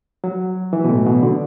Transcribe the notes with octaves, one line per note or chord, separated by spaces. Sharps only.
F#3
E3
B2
A2
B2
D3